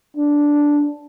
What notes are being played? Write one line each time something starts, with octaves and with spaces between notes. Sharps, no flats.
D4